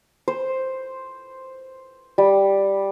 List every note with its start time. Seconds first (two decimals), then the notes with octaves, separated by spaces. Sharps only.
0.28 C5
2.18 G3